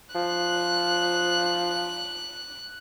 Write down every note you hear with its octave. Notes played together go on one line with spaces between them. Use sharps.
F3 F#6